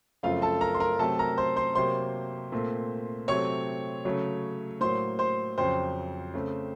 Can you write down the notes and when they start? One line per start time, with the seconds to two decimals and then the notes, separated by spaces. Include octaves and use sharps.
0.23 F#2 C#3 F3 A3 C4 F4 F5
0.42 A4 A5
0.61 A#4 A#5
0.74 C6
0.80 A#4 A#5
0.99 C3 F#3 A3 C4 A4 A5
1.19 A#4 A#5
1.37 C5 C6
1.56 C5 C6
1.75 C3 F#3 A#3 C5 C6
2.52 A#2 A3 C4
3.28 C3 F#3 A3 C4 C#5 C#6
4.05 C#3 F#3 A3
4.81 A2 F#3 A#3 C5 C6
5.19 C5 C6
5.58 F2 C#3 F#3 C4 C5 C6
6.34 C#3 A3 C4